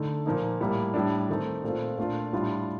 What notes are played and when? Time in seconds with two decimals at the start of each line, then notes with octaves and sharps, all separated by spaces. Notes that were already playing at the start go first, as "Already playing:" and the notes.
Already playing: D3 A3 D#4
0.25 A#2 F3 A#3 D#4
0.61 A2 G3 A#3
0.94 A2 G3 D4
1.29 D#3 A3 C4 D#4
1.63 A#2 A3 C4 F4
1.98 A#2 A3 D4 F4
2.33 A2 G3 D4 F4